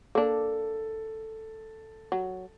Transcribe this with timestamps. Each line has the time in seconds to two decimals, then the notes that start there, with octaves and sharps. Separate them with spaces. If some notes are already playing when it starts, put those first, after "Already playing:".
0.15 A#3 D4 A4
2.12 F#3